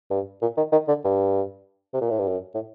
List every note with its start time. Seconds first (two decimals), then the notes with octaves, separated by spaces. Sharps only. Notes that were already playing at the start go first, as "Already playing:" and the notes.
0.10 G2
0.42 A#2
0.57 D#3
0.72 D#3
0.88 D3
1.04 G2
1.93 C3
2.01 A#2
2.10 A2
2.19 G2
2.28 F#2
2.54 A2